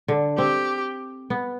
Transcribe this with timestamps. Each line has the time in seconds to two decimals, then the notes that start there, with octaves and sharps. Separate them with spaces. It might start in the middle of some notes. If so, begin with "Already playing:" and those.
0.08 D3
0.38 C4 G4
1.30 B3